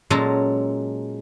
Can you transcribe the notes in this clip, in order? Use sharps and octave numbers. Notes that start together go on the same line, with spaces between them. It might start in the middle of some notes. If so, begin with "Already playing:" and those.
A#2 F#3 G#3 C#4 A4 A#5